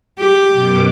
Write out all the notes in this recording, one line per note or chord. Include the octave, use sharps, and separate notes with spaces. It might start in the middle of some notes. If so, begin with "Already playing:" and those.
G4
F#2 B2 D6